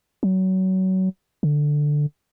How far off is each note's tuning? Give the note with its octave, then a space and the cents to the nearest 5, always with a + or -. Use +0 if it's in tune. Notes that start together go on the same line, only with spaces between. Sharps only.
F#3 +25
D3 +5